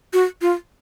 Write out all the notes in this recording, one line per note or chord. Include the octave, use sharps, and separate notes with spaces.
F#4
F4